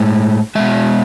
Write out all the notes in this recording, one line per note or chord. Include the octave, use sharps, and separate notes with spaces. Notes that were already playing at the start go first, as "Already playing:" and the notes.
Already playing: A2 G#3
B2 G#3 E5